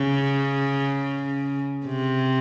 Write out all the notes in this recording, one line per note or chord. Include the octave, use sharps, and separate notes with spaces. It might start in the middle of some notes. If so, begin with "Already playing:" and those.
Already playing: C#3
C3